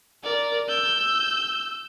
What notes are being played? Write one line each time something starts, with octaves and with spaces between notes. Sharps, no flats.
A#4 D5
E6 G6